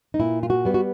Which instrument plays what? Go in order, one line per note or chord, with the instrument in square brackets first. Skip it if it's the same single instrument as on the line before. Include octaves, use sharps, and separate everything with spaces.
[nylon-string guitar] D#4
A#2 E4
F4
F#4
G3 B3
F#4